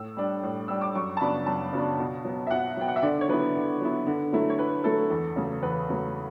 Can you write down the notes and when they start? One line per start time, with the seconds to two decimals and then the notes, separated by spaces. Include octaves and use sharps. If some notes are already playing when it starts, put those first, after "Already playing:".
Already playing: A2 E6
0.17 G3 D4
0.43 A2
0.68 G3 D4 E6
0.81 D6
0.95 F#2 C#6
1.17 A5
1.21 C#3 F#3 B3 D4 B5
1.46 F#2 A5
1.73 C#3 F#3 B3 D4
1.99 B2
2.25 F#3 B3
2.47 E5
2.51 B2 F#5
2.77 F#3 B3 G5
2.88 F#5
2.96 E5
3.03 D3 D5
3.21 C#5
3.28 F#3 B3 E4 B4
3.55 D3
3.81 F#3 B3 E4
4.07 D3
4.32 F#3 A3 E4
4.50 C#5
4.59 D3 B4
4.84 F#3 A3 E4 A4
5.10 E2
5.36 C#3 F#3 A3
5.63 E2 B4
5.89 C#3 F#3 A3